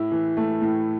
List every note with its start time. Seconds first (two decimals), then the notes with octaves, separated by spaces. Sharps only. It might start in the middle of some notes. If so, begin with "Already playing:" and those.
Already playing: A2 E4
0.12 E3
0.37 A3
0.62 A2